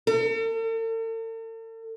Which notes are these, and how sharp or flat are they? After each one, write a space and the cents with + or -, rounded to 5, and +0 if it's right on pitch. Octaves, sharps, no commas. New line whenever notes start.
A4 +45